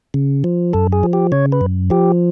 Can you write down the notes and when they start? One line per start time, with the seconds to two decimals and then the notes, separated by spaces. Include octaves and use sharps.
0.14 C#3
0.44 F3
0.73 F#2 A4
0.93 G#4
1.03 F3
1.13 G4
1.32 C#3 C#5
1.52 B4
1.61 F#2
1.90 F3 G4